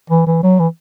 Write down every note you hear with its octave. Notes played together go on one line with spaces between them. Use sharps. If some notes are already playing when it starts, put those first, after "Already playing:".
E3
E3
F#3
E3